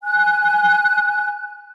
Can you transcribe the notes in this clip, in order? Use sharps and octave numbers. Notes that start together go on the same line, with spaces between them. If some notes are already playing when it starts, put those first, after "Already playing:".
G#5 F#6